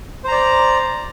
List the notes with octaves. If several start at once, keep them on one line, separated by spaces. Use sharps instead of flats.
C5 D5 A#5